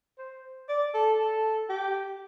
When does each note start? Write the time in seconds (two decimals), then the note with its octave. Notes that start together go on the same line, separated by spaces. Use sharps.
0.18 C5
0.69 D5
0.94 A4
1.19 A4
1.69 G4